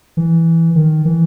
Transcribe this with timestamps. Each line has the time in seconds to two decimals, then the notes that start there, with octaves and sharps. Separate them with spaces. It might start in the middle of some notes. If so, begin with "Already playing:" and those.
0.17 E3
0.75 D#3
1.05 E3